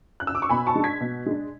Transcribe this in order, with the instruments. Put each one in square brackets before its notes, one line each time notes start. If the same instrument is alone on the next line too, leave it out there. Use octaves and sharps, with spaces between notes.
[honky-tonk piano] F#6
E6
D6
C#6
B2 G#5 B5
A5 C#6
G#3 D4
G#6 B6
B2
G#3 D4